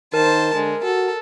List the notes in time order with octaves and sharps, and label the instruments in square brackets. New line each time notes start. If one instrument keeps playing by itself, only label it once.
[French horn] D#3 [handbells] A#4 [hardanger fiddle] C5 A5
[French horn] D3 [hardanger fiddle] G#3
[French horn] F#4 [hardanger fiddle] A4